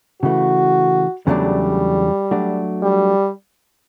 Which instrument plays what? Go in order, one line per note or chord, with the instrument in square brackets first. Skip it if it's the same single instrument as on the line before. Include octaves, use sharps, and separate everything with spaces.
[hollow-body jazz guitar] C#3 E3 A3 [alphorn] F#4
[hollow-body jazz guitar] E2 C#3 F#3 A3 D4 [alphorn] G3
[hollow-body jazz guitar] F#3 A3 D4 F#4
[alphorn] G3